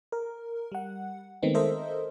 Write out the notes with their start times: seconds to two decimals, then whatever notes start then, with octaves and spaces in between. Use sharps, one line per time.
0.12 A#4
0.72 G3 F#5
1.42 D#3 G#3 A3 B3 C4 D#4
1.54 A4 A#4 C5 D#5 E5